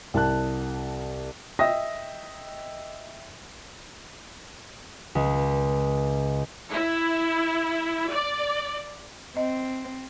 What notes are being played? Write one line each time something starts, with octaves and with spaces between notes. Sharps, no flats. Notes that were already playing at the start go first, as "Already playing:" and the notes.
C2 A5 F#6
D#5 E5 G5 D#6 A#6
C#2
E4
D5
C4 D#5